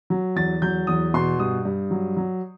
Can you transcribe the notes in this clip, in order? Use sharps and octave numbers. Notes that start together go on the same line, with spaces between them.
F#3
E2 A6
F#3 G6
E2 D#6
B2 C6
G2 D#6
G2
F#3
F#3